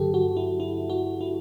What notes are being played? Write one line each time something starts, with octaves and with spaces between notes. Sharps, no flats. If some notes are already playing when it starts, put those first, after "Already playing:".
Already playing: G2 D3 F#3 G4 A4
F#4
E4
E4
F#4
E4